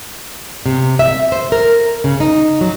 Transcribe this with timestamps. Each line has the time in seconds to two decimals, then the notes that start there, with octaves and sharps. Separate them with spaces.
0.66 C3
0.99 E5
1.32 C5
1.52 A#4
2.04 C#3
2.20 D#4
2.61 F#3